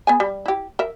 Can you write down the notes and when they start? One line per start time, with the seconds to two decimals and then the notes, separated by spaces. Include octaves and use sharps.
0.07 B3 G#4 G#5
0.20 G3
0.46 E4 G4
0.79 A#4 E5